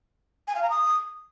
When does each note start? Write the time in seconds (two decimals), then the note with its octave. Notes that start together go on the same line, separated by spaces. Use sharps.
0.48 G#5
0.55 F5
0.63 A#5
0.70 D#6